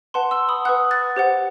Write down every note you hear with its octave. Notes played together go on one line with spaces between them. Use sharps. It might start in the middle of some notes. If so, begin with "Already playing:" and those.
B4 F#5 A5 C6
C6 E6
B5 D#6
B4 F#5 D#6 F#6
F#6 A6
G4 C5 F#5